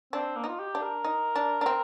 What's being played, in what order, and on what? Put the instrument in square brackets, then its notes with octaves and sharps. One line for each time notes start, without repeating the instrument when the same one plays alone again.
[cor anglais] C4 [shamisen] D4
[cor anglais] A#3
[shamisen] D#4 [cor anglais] F4
[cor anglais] G4
[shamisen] D4
[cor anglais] A#4
[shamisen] D#4
D4
D4
C4